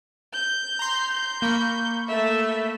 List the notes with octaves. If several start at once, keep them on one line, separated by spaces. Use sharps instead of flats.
G6
A#5 C6
G6
A#3 B5 C#6
A3 E5